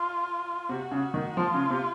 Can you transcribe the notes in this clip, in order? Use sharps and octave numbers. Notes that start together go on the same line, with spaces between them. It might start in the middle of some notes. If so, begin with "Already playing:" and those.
Already playing: F4
C3 F#4
C#3
D#3
F3 F4
C#3
C3